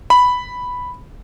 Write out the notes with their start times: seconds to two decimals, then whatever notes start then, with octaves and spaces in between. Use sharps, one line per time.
0.10 B5